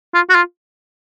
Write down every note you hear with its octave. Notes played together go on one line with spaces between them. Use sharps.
F4
F#4
F4